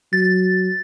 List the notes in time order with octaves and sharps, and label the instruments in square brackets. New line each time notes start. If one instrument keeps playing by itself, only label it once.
[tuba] F#3 [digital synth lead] A6